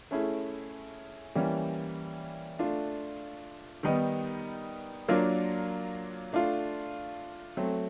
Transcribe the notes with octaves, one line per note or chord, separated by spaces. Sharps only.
A3 C#4 E4 G#4
E3 G3 A#3 C#4 E4
A3 D4 F4
D#3 G3 B3 D#4
F#3 A#3 D4 F4 A#4
A3 D4 F4
F#3 A3 C4